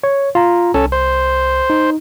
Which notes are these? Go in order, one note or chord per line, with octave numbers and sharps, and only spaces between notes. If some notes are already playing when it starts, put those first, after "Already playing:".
C#5
F4 A#5
C2 C#4 A4
C5
D#4